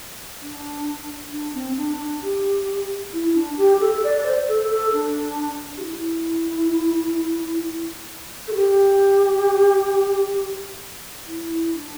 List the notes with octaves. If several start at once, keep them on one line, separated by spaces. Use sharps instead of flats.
D4
D4
C4
D4
D4
G4
E4
D4
G4
A4
D5
D5
C5
A4
A4
D4
G4
E4
A4
G4
E4
D4